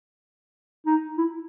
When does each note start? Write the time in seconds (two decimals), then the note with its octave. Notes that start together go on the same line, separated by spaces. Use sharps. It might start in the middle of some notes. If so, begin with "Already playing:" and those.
0.86 D#4
1.18 E4